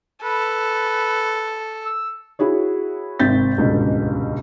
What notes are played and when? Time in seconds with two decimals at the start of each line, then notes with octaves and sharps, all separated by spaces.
0.24 A4 B4
1.85 E6
2.39 E4 F#4 G#4 C#5
3.19 G#1 C3 C4 G6 A6 B6
3.57 D#1 C#2 G#2 B2 D3